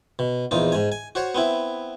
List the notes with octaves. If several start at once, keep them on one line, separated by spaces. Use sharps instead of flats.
B2
A#1 E2 D#4 F4
G#2 G#5
G#5
F#4 C5 C#5
B3 C4 E4